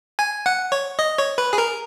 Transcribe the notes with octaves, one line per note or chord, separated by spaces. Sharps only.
G#5
F#5
C#5
D#5
C#5
B4
G#4
A#4